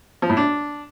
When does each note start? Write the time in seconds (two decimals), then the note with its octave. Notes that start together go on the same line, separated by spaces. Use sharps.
0.22 F3
0.30 A2
0.37 D4